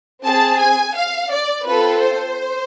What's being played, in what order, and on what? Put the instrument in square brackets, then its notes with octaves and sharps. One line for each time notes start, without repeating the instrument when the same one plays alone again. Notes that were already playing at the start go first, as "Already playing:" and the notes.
[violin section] C4 G#4 A5
G#5
F5
D5
C4 F4 A4 B4
C5